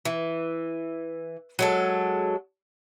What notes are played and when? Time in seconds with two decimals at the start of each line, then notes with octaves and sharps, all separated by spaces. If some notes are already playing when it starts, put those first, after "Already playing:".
0.05 E3
1.59 F#3 G#3 A4